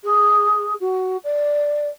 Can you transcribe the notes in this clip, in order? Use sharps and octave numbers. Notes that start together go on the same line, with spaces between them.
G#4
F#4
D5